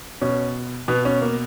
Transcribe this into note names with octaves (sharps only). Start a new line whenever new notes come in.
B2 C#4
B2 B3
C#4
A#3